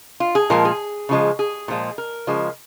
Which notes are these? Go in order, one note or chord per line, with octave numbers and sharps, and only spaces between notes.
F4
G#4
A#2 F3 G#3 A#4
G#4
C#3 F3 G#3
G#4
A#2 F3 G#3
A#4
C#3 F3 G#3